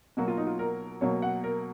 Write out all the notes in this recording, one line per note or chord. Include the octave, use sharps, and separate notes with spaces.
B2 F#3 A#3 F#4
F4
D#4
F4
A#4
B2 F#3 A#3 C#5
F#5
A#4